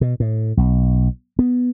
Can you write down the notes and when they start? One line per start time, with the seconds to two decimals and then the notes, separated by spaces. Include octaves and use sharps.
0.01 B2
0.20 A2
0.57 B1
1.39 B3